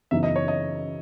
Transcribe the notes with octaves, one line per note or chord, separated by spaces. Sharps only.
F#2 C#3 E3 B3 D#4 E5
D#5
C#5
D#5